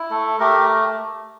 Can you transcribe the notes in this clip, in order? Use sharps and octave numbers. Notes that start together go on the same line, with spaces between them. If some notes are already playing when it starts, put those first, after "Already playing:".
Already playing: E4
A3 A4
A3 G4 A#4